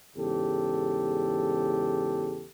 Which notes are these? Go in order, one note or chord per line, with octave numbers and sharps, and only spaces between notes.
E2 G#2 C#3 G4 A4